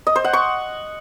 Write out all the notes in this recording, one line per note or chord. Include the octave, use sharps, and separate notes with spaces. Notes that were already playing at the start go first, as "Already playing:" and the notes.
D#5
C5
F#5
C#6